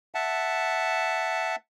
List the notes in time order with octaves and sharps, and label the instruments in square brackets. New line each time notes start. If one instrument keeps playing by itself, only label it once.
[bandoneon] E5 F#5 A5